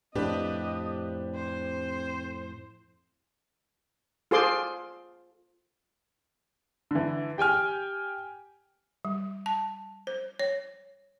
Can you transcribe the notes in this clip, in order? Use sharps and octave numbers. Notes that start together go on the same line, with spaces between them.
F2 A2 C4 D4 G4 B4 D#5
C5
F4 G#4 A4 C5 C6 D6
D3 E3
G4 G5 G#5 F6
G3
A5
C5
C#5